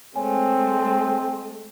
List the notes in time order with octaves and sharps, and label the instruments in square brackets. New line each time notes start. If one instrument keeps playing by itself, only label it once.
[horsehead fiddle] G#3 A3 [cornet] C4 [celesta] C#5 G#5